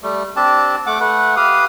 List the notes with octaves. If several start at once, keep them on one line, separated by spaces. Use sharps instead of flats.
G3 A3
C4 D4 G4 A5
A3 F#5 D6
A3 B4 F#5
G4 B4 F5 D#6